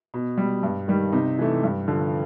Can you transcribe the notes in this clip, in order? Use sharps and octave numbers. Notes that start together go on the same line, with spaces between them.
B2
G3
G2
D#3 G3
C3 D#4
E3 A3
G2
D3 F3